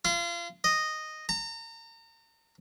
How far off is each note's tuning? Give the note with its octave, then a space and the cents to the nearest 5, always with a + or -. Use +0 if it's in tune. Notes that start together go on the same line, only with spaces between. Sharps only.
F4 -30
D#5 -5
A#5 -35